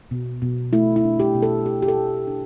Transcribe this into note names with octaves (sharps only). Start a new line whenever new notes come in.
B2
B2
A3 E4
E4
D4
G4
B2
A4
B2 G4
G4
A4
A3
D4